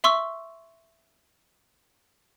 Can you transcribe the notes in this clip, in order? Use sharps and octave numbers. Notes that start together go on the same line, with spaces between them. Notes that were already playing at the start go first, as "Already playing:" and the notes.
E5 C6 C#6 E6